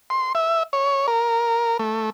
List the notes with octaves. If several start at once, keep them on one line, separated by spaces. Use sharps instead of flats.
C6
E5
C#5
A#4
A3